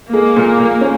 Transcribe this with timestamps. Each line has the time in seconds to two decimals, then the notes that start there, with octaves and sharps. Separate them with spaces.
0.12 G#3 A#3
0.36 A#2
0.58 A#2
0.81 C#4